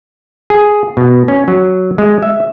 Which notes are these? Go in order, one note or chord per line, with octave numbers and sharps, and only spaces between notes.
G#4
B2
C#4
F#3
G#3
E5